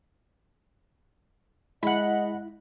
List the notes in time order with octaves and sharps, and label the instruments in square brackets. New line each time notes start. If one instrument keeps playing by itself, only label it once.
[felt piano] G#3 [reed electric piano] E4 [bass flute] D#5 [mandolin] F#5 B5